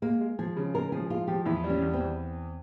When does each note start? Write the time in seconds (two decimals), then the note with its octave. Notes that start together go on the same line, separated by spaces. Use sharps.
0.02 G#3 A#3
0.21 G#3
0.39 F3 G#4
0.57 C#3
0.74 G#3 A#4
0.92 F3 G#4
1.10 G#3 F4
1.28 F3 G4
1.46 E2 E4
1.64 G3
1.70 C#4
1.82 E2
1.94 C4
2.00 E2